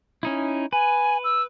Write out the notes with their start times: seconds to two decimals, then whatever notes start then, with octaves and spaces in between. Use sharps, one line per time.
0.23 C#4 D#4 E4
0.73 B4 G#5
1.24 E6